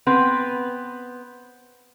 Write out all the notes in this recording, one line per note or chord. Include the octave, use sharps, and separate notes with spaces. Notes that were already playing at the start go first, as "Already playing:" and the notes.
B3 C4 B4